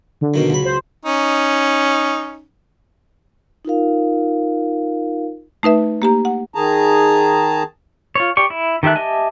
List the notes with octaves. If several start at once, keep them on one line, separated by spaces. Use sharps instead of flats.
D3
B2 D#3 F#3
C#2 F#3 B5
C5
C#4 D#4
D#4 F4 A#4 F5
A3 D#4 B4 E5
A#3 G4 A#5
F#5
D#3 G#4 A5 A#5
F4 C#5
G4 D5 C#6
E4
D#3 G4 A4 E5 F#6
G4 D#5 E5 G#5 A5